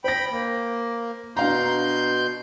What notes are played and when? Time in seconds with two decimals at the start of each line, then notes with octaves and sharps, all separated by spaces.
0.04 C5 G5 B5 A#6
0.31 A#3
1.37 B2 D4 F5 A#5 C6 G6